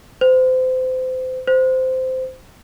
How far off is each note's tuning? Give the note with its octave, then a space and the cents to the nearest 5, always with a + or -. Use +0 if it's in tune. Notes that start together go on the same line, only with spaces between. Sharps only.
C5 -30
C5 -15